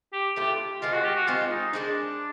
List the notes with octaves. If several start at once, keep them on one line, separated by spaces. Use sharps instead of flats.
G4
E3 A3 D4 F4 G4
D#3 G#3 C4 F4
F#4
G4
F#4
D#3 G#3 C4 F4
D#4
D#3 G#3 C4 D4